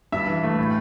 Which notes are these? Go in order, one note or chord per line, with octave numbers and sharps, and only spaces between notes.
G2 E5
E3
A3
A2